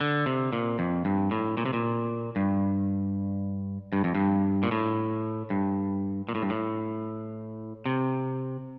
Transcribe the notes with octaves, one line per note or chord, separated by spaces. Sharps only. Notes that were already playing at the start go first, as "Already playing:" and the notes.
D3
C3
A#2
F2
G2
A2
A#2
C3
A#2
G2
G2
F2
G2
A#2
A2
G2
A#2
A2
G2
A2
C3